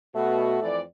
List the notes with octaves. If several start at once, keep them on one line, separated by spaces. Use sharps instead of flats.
B2 A3 F#4
F2 E3 D5